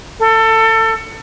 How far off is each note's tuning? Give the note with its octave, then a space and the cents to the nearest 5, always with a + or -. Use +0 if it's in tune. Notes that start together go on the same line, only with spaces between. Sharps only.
A4 +25